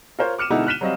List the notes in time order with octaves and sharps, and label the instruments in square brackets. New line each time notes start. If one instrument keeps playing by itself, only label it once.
[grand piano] F4 A#4 C5 C#5
D6 F6 C#7 D#7 E7
B2 D3 G#3 B3 D#4 E4
F6 F#6 B6 D#7 E7 G7
F#3 G3 C4 F#4 D#5 F5